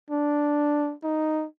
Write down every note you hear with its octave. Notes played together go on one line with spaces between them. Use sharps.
D4
D#4